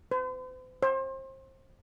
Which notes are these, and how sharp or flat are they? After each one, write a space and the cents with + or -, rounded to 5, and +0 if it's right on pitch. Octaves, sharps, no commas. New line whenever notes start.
C5 -45
C5 +30